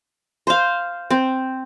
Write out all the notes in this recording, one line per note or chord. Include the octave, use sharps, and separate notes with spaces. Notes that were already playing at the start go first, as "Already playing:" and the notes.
C5 F5
C4